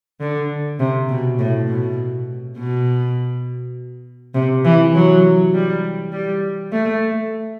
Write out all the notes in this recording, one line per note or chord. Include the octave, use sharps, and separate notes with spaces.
D3
C3
B2
A2
B2
B2
C3
E3
F#3
G3
G3
A3